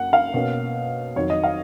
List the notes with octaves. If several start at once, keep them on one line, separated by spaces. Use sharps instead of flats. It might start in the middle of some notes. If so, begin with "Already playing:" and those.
Already playing: F#2 A#3 F#5
F5
B2 A#3 C#4
F2 D#3 F#3 C#5
D#5
F5